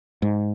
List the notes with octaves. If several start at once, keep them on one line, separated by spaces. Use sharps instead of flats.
G#2